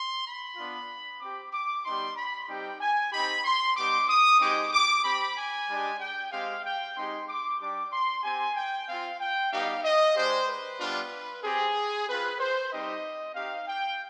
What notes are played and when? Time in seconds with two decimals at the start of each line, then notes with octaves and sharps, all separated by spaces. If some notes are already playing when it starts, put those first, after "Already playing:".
Already playing: C6
0.24 B5
0.56 B3 D4 F4
1.19 C4 G4 D6
1.52 D6
1.84 G3 B3 D#4 C6
2.16 B5
2.47 G3 C4 D#4 G4 G5
2.80 G#5
3.12 C4 D#4 G4 B5
3.44 C6
3.76 G3 B3 D#4 G4 D6
4.08 D#6
4.40 G#3 C4 D#4 G4 D6
4.72 D6
5.04 C4 G4 B5
5.36 G#5
5.68 G#3 D4 G4
6.00 G5
6.31 G#3 C4 G4 F5
6.64 G5
6.96 G#3 C4 D#4 G4 C6
7.27 D6
7.59 G3 D4 G4 D6
7.92 C6
8.23 C4 G4 G#5
8.55 G5
8.87 C4 F4 F5
9.20 G5
9.51 G3 B3 D#4 G4 F5
9.83 D#5
10.15 G#3 D4 G4 C5
10.48 B4
10.79 G3 B3 D4 F4
11.43 C4 G4 G#4
12.08 C4 F4 B4
12.39 C5
12.71 G3 C4 D#4 G4 D#5
13.35 C4 D#4 G4 F5
13.68 G5